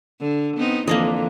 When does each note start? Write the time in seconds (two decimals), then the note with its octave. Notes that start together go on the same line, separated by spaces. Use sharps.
0.20 D3
0.57 B3 C4 D#4
0.88 F2 D3 E3 A#3 D4 D#5